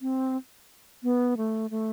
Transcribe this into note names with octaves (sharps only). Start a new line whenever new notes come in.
C4
B3
A3
A3